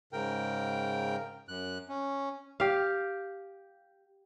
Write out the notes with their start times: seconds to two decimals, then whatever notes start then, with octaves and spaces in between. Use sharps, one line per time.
0.13 G#2 C#3 A#4 G5
1.48 F#2 F#6
1.89 C#4
2.60 G4 F5